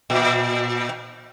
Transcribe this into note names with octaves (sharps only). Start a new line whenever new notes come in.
A#2